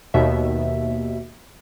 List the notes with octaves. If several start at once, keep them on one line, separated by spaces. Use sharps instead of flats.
D#2 B2 E5